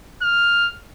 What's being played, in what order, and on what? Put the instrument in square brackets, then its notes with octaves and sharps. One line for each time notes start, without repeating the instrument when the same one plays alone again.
[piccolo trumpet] F6